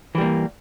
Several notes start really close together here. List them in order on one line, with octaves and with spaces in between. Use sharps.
E3 G3 A#3